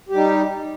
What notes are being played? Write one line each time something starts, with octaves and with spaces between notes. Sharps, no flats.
G3 D#4 G4